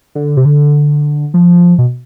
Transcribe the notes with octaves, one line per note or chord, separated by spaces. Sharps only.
D3
C3
D3
F3
B2